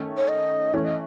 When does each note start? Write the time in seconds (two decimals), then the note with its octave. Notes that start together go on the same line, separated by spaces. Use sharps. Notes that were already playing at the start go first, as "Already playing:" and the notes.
Already playing: D#3 A3 C#4
0.17 C#5
0.28 D#5
0.74 E3 A3 C#4 C#5
0.85 D#5